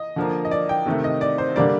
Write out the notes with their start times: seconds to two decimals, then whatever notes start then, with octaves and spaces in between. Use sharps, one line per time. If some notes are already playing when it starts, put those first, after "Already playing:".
Already playing: D#5
0.16 D3 F3 A#3
0.45 D#5
0.51 D5
0.69 G5
0.86 C3 D#3 A3
1.04 D#5
1.21 D5
1.38 C5
1.56 D3 G3 A#3 D5